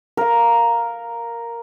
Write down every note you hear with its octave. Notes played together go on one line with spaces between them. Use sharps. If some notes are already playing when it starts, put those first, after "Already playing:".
A#4 F5